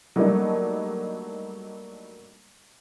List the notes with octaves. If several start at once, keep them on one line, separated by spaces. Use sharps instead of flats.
F#3 G3 A3 A#3 D4 D#4